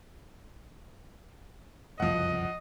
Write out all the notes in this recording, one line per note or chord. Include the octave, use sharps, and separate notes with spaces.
F#1 C2 F2 F3 D#5 F#5